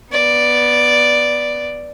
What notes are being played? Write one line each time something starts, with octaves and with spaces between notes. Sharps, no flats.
B3 D5